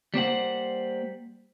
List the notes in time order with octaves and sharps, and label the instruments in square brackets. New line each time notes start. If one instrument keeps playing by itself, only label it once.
[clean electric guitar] G3 A#3 C5 F#5